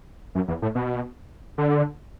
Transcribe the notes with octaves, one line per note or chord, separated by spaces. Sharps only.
F#2
E2
A2
B2
D3